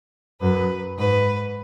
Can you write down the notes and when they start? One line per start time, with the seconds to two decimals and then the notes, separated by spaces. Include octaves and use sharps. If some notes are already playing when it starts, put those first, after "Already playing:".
0.41 F#2 B4
0.98 G#2 B4